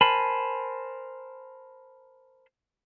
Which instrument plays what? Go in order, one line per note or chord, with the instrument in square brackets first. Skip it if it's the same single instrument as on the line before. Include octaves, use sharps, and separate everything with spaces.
[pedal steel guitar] A#4 C5 G#5 A5 B5